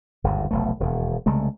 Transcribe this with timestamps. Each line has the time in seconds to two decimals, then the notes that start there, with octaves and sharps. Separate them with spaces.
0.24 G1 D#2 G#2
0.51 F1 B1 A3
0.80 E1 D#2 B2
1.26 C2 C#3 G#3 A3